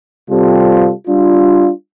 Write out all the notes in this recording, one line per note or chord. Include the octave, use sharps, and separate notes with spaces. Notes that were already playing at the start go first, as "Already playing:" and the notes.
C3 G3 C4 F4 A4
G3 D4 F4